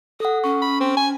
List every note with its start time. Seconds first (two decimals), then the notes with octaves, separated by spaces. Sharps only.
0.20 A4 F#5 D#6
0.44 C#4 C#6
0.62 B5
0.80 C4
0.97 G#5